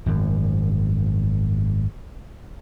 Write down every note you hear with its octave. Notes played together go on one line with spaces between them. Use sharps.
G#1 F#2